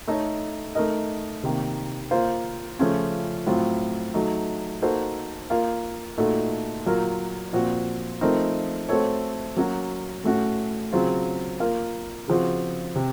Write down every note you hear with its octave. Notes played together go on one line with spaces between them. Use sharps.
A3 D#4 A4 C#5
A3 D#4 A#4 D#5
C3 D#3 A#3
A#3 F4 C5 F5
C#3 F3 A3 C#4 F4
A2 F#3 C4 F4
F#3 A3 D#4
A#3 D#4 F#4 A4 C5
A#3 F4 A#4 F5
A#2 A3 D#4 F#4 A4
A#2 F#3 A#3 F4 A#4
A#2 F3 C4 F#4
F3 A3 C4 D#4 A#4
A3 C4 F#4 A4 C#5
F#3 A#3 C#4 F#4
A2 A3 C#4 F#4
C#3 F#3 C4 F4
A#3 F4 A#4 F5
C#3 F3 C4 F#4
C3